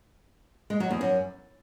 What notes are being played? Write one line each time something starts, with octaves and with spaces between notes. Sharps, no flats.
G#3
F#3
E2
F#2